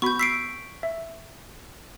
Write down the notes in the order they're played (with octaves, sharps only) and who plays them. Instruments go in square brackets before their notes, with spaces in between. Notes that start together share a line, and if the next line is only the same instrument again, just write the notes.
[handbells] B3 F#4 B5 [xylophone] C#6 G6
[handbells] E6 [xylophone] B6 C7 D7
[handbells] E5